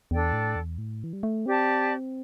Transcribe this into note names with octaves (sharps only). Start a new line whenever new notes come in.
E2 D4 A4 D5 G5
A2
E2
A2
E3
G3
A3
C4 G4 D5 A5